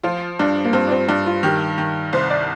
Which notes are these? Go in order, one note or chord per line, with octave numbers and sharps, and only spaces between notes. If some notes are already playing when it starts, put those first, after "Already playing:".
F3 F4
G2 D4
A#3
G2 C4
D4
C4
G2 D4
F4
D#3 G4
D#3
C2 C5
D5